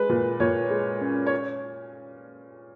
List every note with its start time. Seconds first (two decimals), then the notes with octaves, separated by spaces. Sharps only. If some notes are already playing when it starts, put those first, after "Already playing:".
Already playing: G#3 B4
0.09 A#2
0.40 A#2 C#5
0.70 G#3
1.01 C#4
1.27 C#5